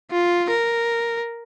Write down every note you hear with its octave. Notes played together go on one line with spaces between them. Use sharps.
F4
A#4